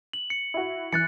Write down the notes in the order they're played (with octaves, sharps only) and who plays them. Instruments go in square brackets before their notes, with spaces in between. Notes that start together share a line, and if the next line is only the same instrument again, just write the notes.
[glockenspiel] F#7
C#7
[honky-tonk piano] E4 F#4
[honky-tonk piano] E3 [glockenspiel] F#6 A6 C#7